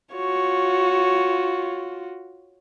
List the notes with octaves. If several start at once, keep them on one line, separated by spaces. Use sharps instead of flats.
F4 F#4 C#5